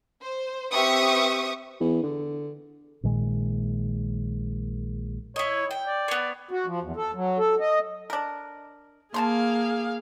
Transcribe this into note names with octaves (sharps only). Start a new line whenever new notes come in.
C5
C4 G4 B4 E5 C#6 D#6
E2
D3
A#1 A#2 D#3 G#3
E4 C#5 D#5
G5
D5
B3 C#5
F#4
F3
E2
A4
F#3
A4
D#5
D4 A#4
A#3 G#4 F5 A5 A#5 C6